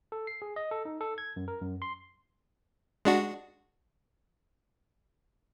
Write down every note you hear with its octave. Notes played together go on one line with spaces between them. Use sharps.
A4
C7
G#4
D#5
A4
D#4
A4
G#6
F#2
A#4
F#2
C6
G#3 D4 F#4